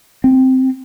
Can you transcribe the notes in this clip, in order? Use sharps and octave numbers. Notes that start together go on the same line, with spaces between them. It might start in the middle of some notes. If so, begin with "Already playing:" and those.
C4